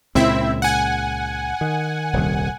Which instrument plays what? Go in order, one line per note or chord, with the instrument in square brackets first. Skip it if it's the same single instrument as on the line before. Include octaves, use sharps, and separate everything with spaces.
[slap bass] C#2 A#2 C#3 [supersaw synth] C4 E4 E5
[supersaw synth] F#5 G#5
[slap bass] D#3
D#1 C2 D#3